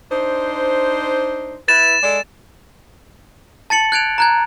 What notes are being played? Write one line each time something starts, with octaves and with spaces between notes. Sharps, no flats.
D4 D#4 C5
E4 B4 A6 E7
G#3 A4 D5
A5 A6 C#7 F#7
F#6 G#6 D7 F7
A#5 F#6 G#6